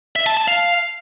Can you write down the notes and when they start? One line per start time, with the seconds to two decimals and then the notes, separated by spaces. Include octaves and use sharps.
0.16 E5
0.26 A5
0.37 A5
0.48 F5